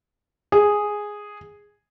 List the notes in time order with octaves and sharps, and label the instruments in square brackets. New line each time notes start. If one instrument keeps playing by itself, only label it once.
[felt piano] G#4